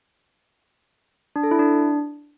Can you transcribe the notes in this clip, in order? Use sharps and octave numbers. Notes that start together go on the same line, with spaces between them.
D4
A4
E4
D4